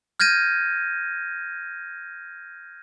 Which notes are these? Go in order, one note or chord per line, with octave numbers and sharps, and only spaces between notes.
F6 G6 G#6 A#6 D#7